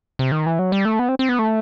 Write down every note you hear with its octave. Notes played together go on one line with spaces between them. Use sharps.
C3
D#3
E3
F#3
G3
A3
B3
C4
C4
B3
A3